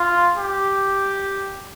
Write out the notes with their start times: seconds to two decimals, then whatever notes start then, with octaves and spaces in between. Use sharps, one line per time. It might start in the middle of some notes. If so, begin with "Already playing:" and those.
Already playing: F4
0.37 G4